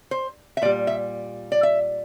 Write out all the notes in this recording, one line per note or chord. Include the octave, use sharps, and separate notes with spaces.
C5
E5
A#2 G3 D5
E5
D5
E5